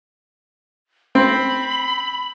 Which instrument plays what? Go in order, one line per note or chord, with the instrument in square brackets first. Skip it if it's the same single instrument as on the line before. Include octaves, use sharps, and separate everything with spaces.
[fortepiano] C4 [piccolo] B5